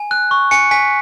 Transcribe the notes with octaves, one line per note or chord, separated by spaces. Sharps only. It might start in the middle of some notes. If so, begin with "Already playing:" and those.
Already playing: G#5
F#6
C#6
G#5 C#7
G#5 B6